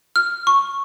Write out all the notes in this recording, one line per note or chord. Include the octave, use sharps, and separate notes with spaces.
F6
C#6